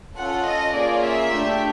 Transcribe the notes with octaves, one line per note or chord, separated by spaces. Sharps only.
C#4 F4 A4 F#5
D#5
A#3 C#4 F4 G#4 D5
E5
A3 D4 G4